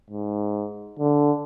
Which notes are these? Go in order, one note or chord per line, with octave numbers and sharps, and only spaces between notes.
G#2
D3